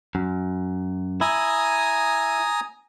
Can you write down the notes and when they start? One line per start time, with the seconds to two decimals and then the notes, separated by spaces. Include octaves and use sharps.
0.15 F#2
1.21 E4 G#5 A#5 D#6